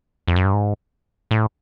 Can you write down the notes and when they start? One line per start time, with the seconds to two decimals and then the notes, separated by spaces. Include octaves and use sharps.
0.28 F2
0.36 F#2
0.45 G2
0.53 G#2
1.31 A2